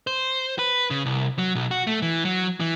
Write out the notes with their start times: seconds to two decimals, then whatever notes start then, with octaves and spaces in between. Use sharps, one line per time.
0.07 C5
0.59 B4
0.90 C#3
1.06 C2
1.38 F#3
1.55 B1
1.71 F#4
1.87 A3
2.02 E3
2.25 F#3
2.60 E3